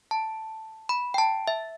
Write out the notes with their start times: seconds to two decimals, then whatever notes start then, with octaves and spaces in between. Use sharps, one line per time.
0.11 A5
0.89 B5
1.14 G5
1.18 A5
1.48 E5